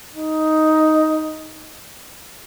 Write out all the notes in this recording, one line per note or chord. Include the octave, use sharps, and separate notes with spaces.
D#4